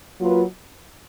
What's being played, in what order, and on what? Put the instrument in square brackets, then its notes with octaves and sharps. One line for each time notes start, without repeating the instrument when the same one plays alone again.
[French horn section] F#3 A#3 F4 B4